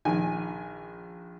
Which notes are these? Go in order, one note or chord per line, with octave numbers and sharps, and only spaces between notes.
A#1 D#3 G#5